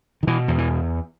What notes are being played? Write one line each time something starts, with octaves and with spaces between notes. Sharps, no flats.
D#3
B2 E3
E2
E3